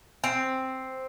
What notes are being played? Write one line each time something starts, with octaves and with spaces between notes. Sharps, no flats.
C4